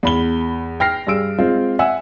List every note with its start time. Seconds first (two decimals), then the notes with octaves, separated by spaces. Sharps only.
0.03 E2 B5 G7
0.80 G5 F6 A#6 C7
1.07 G2 G#4 E6 D7
1.38 G#3 C4 F4
1.79 E5 F#5 G#5 E6